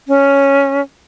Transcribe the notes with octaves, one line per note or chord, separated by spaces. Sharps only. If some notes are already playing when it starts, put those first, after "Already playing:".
C#4